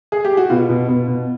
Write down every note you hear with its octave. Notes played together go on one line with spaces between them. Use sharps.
G#4
G4
F#4
B2 F4
B2
B2
B2